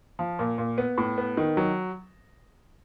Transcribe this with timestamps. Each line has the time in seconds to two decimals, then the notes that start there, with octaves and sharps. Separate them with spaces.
0.19 F3
0.39 A#2
0.58 A#2
0.78 B3
0.98 A2
1.18 B3
1.37 D#3
1.57 F#3